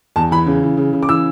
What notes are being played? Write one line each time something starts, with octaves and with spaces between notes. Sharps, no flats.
E2 A5
E3 B5
C#3
E3
C#3
C#3
D6
E3 E6